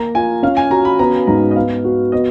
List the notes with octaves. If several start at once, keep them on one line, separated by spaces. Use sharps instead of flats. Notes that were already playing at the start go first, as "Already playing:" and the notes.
Already playing: A#3 A#5
F4 G#5
C#4 F5
G#5
F#4 A#5
B5
B3 A#5
G#2 A#5
D#5
B3 F5
F#4
B3 D#5